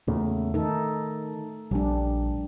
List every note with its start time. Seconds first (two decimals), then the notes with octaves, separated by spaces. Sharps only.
0.08 E2 A#2 C#3 A3
0.54 D#3 D#4 A4
1.71 A#1 G3 D4